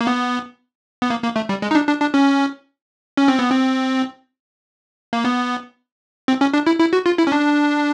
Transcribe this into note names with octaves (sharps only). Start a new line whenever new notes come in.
A#3
B3
B3
A#3
A#3
A3
G3
G#3
D#4
D4
D4
D4
C#4
C#4
C4
B3
C4
A#3
B3
C4
C#4
D4
E4
E4
F#4
F4
E4
C#4
D4